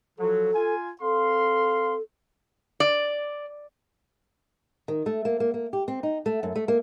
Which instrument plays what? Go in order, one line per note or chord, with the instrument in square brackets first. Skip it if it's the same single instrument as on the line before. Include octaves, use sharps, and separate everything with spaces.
[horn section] F3 F#3 [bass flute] A4
[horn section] F4 G#5
[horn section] C4 F5 C6 [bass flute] A4
[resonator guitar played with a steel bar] D5
[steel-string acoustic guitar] D#3
A3
A#3
A#3
A#3
G4
C4
D#4
A3
F#2
A3
A#3